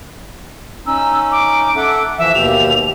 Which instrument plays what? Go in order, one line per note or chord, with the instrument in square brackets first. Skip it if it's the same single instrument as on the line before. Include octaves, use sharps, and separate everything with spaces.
[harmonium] C#4 D#4 [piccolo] E6
[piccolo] D6
[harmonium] A4 E5 F#5
[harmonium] E3 F3 [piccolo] E5
[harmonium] D#2 B2 G4 [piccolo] F7